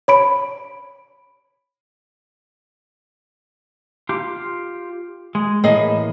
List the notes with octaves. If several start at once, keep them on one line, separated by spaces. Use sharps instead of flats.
C#5 B5 D7
F4 G4
G#3
A2 E3 A#3 G#4 D#5